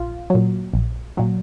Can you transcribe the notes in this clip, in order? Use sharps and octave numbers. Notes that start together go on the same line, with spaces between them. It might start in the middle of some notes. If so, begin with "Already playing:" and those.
Already playing: A#1 F4
A#2 F#3
A#1
A#2 F#3